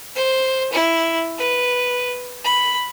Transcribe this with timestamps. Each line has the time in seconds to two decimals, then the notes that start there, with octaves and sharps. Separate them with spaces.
0.15 C5
0.72 E4
1.38 B4
2.44 B5